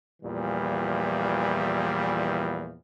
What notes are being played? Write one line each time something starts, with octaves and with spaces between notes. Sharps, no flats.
E2 A#2 E3 F3 G3